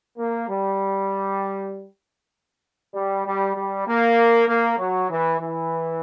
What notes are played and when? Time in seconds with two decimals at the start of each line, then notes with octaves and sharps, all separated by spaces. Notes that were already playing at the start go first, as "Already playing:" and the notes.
0.18 A#3
0.49 G3
2.94 G3
3.25 G3
3.55 G3
3.87 A#3
4.48 A#3
4.78 F#3
5.09 E3
5.40 E3